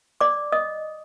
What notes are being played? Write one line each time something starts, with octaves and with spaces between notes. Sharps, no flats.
D5 D6
D#5 D#6